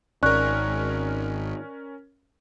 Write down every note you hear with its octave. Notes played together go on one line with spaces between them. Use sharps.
G#1 C#4 A#4 D5 C#6 F#6